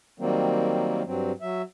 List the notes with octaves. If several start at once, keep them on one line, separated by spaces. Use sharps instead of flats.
D#3 F#3 G3 A#3 C4
G2 F#3 C4
F#3 E5